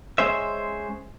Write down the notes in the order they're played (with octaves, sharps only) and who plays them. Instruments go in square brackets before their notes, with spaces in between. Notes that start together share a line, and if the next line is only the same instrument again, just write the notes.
[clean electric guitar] G#3 C#4 C5 E5